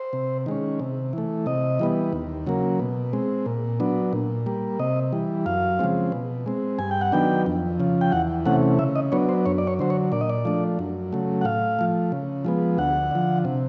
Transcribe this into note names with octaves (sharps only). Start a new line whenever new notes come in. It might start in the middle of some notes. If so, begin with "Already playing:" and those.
Already playing: C5
C3
D#3 G#3 C#4
C3
E3 A3
C3 D#5
E3 G3 B3
D#2
C#3 F#3 A#3
B2
G#3 C4
A#2
F#3 B3 D4
A#2
G3 A#3
C3 D#5
E3 G3
F#2 F5
C#3 F3 G#3 C4
B2
G#3 C4
G2 G#5
G5
F#5
D#3 F#3 B3 D4 G5
F2
C#3 F3
G5
E2 F#5
C3 E3 A3 C#4 F#5
C#3 E5
D#5
F#3 B3 D4 C#5
C5
F#2 C#5
D5
C#5
D3 F#3 C5
C#5
A#2 D5
D#5
D5
F3 A3 D4
F#2
C#3 F#3 A3
F#5
A2 F5
F3 A3
C#3
F3 G#3 B3
D2 F#5
D3 F3
C3